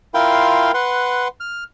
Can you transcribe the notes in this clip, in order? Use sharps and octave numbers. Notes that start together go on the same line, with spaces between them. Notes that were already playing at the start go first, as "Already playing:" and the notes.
E4 F4 A#4 F5 G5 C6
B4 F#5 C6
F6